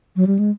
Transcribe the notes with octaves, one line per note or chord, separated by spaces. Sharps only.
F#3
G3
G#3